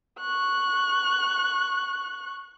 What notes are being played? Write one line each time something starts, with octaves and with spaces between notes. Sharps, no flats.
C#6 F#6